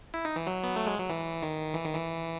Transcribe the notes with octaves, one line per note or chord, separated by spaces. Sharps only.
E4
D#4
E3
F#3
B3
A3
G#3
F#3
E3
D#3
E3
D#3
E3